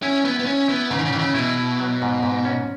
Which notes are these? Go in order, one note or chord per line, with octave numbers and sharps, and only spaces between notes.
C#4 E4
B3 E4
B3
C#4 E4
B3 E4
G#2 C#3
D#3
C#3
D#3 E3
C#3
B2 E4
E4
F#3
G#2
G#2
C#4